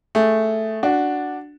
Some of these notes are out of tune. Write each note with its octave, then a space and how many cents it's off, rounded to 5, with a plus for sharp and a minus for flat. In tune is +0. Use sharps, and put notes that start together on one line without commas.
A3 +0 G#4 +0
D4 +0 F#4 +0